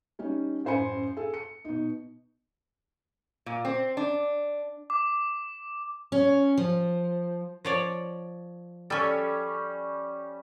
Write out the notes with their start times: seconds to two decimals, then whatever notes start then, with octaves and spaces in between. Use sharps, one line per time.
0.19 G3 C#4 D#4
0.65 A1 F#2 C5 G#5 B5 C#7
1.17 G#4 A4
1.34 C#7
1.65 B2 D#4
3.46 A#2
3.65 C4
3.97 D4
4.90 D6
6.12 C#4
6.57 F3
7.65 F3 C#5 D5
8.90 G3 C#4 A4 G#5